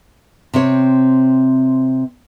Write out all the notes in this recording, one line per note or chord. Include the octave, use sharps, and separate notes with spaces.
C3 C4 C#5